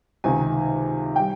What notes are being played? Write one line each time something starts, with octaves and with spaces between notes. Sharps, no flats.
C#2 C3 D#3 G#5
G3 G5